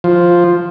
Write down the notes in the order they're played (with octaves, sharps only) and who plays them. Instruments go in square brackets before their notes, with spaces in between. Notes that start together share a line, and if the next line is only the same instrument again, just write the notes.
[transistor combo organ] F3